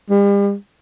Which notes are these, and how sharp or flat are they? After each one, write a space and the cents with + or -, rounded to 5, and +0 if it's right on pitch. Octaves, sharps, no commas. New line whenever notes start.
G3 +40